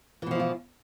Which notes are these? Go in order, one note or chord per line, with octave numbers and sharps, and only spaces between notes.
B2 E3 F3 E4 F4